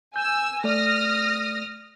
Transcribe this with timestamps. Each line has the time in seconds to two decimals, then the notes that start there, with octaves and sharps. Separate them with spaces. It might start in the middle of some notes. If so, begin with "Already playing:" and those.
0.16 G#5 E6 G6
0.64 A3 D5 D#6 F6 A#6